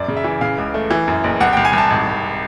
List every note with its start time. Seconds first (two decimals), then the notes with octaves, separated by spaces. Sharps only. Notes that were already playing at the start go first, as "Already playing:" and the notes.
Already playing: F#2 D5
0.08 C#3
0.17 E5
0.24 E3
0.41 C#3 F5
0.58 C#2
0.74 A3
0.91 E3
1.08 F#2
1.24 F#1
1.40 C2 F#5
1.53 C2 G5
1.65 G#5
1.73 C2 A5
1.90 G#1
2.07 G#1